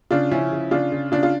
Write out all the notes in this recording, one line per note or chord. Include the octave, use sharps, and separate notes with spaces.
C#3 D4 F4
F3 C#4 E4
C#3
C#3 D4 F4
C#3
C#3 D4 F4
F4